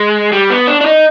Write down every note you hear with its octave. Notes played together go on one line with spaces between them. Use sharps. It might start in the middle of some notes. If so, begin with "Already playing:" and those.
Already playing: G#3
G3
B3
D4
D4
D#4